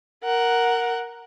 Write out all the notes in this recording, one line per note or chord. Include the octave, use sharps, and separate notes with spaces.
A#4 F#5